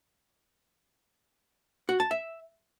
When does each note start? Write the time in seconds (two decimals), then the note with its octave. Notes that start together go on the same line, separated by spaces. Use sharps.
1.89 F#4
2.00 A5
2.11 E5